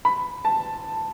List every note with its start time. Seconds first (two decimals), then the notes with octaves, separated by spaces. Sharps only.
0.05 B5
0.45 A5